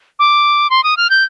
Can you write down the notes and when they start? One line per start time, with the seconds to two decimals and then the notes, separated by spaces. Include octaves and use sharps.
0.19 D6
0.70 C6
0.84 D#6
0.97 F6
1.10 G6